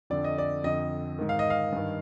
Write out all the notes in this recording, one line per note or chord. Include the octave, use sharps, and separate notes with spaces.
F2 D3 D5
D#5
D5
F2 D3 D#5
G#2 D#3
F5
D#5
F5
G2 D#3